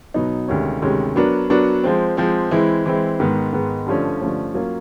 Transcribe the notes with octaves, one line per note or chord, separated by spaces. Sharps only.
B2 F#3 B3 D#4
D2 C3 D#3 G#3 C#4
D2 C3 D#3 G#3 C#4
F#3 B3 D4 F#4 A#4
F#3 B3 D4 F#4 A#4
F3 G#3 C4
F3 G#3 C4
E3 G#3 C4 E4
E3 G#3 C4 E4
G#2 D#3 G#3 B3
G#2 D#3 G#3 B3
G2 D3 F3 A3 C#4
G2 D3 F3 A3 C#4
F#3 A#3 C#4 F4